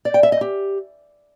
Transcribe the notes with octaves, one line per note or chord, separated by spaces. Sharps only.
D5
G5
E5
D#5
G4